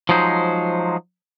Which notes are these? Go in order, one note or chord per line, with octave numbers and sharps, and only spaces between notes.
F3 F#3 G#3 D#4 C5